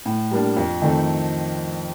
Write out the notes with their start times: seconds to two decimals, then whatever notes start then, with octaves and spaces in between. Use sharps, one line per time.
0.06 A2
0.31 G3 A#3 D4
0.57 F2
0.82 D#3 A3 C4 D#4